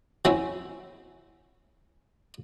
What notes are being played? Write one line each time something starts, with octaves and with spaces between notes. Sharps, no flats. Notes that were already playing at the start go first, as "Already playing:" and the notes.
F#3 C4 C#4 E4